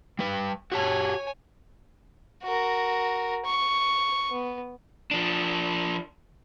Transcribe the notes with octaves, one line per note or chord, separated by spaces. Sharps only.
G3 B4
F#4 G4 C#5 G#5 A5
F#4 A#4
C#6
B3
F3 D4